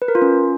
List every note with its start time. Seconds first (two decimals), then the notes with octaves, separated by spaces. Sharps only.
0.02 B4
0.08 A#4
0.15 F4
0.22 C#4